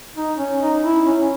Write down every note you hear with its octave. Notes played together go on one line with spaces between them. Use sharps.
D#4
C#4
D#4
E4
C#4